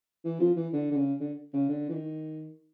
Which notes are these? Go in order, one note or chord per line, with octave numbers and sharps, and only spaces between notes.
E3
F3
E3
D3
D3
C#3
D3
C#3
D3
E3
D#3